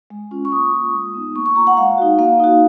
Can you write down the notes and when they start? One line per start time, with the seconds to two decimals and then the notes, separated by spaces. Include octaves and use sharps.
0.10 G#3
0.31 C#4 F4
0.45 C#6
0.52 A#3 D#6
0.73 F4
0.94 G#3
1.14 B3 D#4
1.35 A#3 C#6
1.46 C#6
1.56 F4 A#5
1.67 F#5
1.77 G#3 F5
1.98 D#4 F#4
2.19 A#3 F5
2.40 D#4 F#4